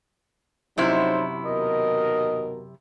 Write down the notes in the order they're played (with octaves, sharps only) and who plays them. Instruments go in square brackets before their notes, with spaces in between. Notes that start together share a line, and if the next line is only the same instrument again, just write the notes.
[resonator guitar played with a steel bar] F#2 C3 E4 [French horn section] F3 F#3 D#4 [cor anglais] C5
[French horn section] D#2 B2 A#4 [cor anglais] D#5